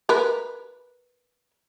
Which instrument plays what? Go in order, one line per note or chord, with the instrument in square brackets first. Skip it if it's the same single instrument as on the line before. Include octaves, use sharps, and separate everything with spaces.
[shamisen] A#4 B4